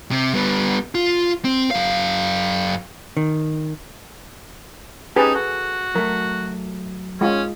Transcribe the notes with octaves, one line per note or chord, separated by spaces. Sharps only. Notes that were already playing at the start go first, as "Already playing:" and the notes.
C3
G3 B3
F4
C4
F#2 F5
D#3
C#4 D#4 G4 G#4 B4 A5
F#4 A4
F#3 A3 A#4
G#3 C#4 F4